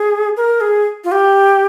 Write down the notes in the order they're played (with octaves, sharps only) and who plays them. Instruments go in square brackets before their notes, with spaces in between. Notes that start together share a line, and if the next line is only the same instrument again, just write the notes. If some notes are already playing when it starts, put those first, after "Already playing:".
Already playing: [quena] G#4
A#4
G#4
F4
G4